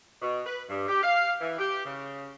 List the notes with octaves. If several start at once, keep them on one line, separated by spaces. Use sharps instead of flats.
B2
B4
G2
G4
F5
E3
G4
C#3